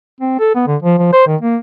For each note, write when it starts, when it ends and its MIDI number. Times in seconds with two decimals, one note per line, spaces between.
0.20 0.38 60
0.39 0.54 69
0.55 0.63 59
0.67 0.77 50
0.82 0.98 53
0.98 1.11 53
1.13 1.26 72
1.27 1.36 51
1.41 1.57 58